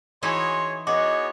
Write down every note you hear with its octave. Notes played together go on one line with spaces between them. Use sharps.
E3 D#4 E4 F#4 G#4 C#5 C6
B3 F#4 G#4 C#5 D#5 D6